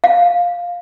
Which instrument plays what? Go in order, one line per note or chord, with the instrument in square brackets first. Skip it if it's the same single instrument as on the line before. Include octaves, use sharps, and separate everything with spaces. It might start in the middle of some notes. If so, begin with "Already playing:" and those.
[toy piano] F5